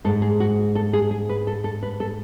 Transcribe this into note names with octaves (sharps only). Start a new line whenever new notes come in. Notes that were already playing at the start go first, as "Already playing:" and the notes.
G#2 G#3 A4
G#4
F#4
A4
G#4
G#4
B4
A4
A4
B4
A4